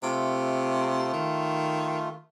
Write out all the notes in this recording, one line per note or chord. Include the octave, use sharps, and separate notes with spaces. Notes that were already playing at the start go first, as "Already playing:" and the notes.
C3 A3 F4
D#3